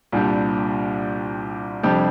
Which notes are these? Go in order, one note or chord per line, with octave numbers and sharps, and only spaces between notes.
C2 A#2 G3 D4 G4
F2 C3 G3 D4 G4